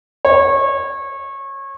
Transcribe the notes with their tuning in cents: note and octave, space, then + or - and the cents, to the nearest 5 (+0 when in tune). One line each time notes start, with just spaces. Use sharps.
C#5 -25